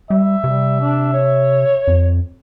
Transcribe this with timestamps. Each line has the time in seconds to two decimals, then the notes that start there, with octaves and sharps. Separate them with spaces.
0.10 G3 E5
0.44 C3 G3
0.80 D4
1.13 C#5
1.87 F2